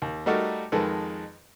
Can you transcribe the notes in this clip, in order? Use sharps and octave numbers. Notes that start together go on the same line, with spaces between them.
D#2
G3 A3 D#4 F#4 A4 A#4
F2 D#3 G#3 A4 B4